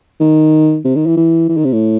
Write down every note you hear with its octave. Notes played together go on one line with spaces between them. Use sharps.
D#3
C3
D#3
E3
E3
E3
D#3
C3
A2